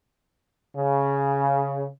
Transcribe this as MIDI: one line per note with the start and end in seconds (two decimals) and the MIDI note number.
0.76 1.88 49